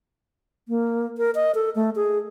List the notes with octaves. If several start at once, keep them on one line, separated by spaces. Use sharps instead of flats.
A#3
A#4
D#5
A4
A3
G#4